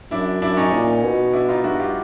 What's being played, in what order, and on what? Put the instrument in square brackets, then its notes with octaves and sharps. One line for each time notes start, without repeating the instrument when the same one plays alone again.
[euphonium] F#2 [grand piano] D4 E4
[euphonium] F#2 [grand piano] D4 E4
[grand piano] C#4 D#4
[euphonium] A#2
B2
[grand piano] D4 E4
D#4 F4
[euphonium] G2 [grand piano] E4 F#4
[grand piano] F4 G4